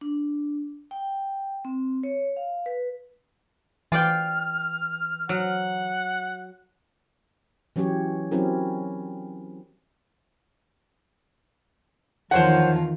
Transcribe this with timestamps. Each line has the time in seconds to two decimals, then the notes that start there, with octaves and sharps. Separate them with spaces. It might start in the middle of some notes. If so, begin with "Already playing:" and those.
0.01 D4
0.91 G5
1.65 C4
2.03 C#5
2.36 F5
2.66 B4
3.92 E3 F4 D5 G5 F6
5.29 F#3 F#5
7.76 E3 F#3 C#4 G4 C#5
8.31 F#3 C4 C#4 E4 G4 A#4
12.31 E2 D#3 F3 F4 C5 C#5 F#5